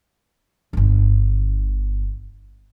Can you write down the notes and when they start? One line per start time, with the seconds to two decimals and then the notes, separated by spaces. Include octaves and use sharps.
0.73 D1 G1